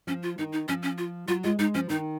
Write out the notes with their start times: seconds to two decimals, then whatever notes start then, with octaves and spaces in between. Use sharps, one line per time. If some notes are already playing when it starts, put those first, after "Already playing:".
0.07 F3 C#4
0.23 F4
0.38 D#3 D#4
0.53 D#4
0.68 F3 C#4
0.83 C#4
0.98 F4
1.28 F#3 F4
1.44 G#3 F4
1.59 G#3 D#4
1.75 F3 C#4
1.89 D#3 D#4